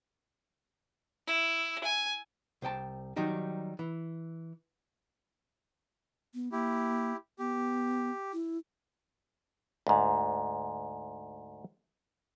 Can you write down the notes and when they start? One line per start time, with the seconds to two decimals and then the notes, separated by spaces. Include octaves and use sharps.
1.27 E4
1.84 G#5
2.62 C2 C5 G5 A5
3.16 D#3 F#3 G3 D#4 G4
3.79 E3
6.34 B3
6.52 A#3 E4 G4
7.39 B3 G4
8.33 E4
9.87 D2 G#2